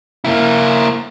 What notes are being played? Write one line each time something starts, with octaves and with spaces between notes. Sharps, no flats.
A#3 E4